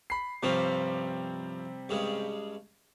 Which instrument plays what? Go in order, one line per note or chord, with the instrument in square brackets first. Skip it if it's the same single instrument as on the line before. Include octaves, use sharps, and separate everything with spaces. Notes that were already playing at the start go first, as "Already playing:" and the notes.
[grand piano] B5 C7
[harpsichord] G2 F3 C#4 [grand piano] C3 G3 C4
[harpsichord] G2 C#3 G#3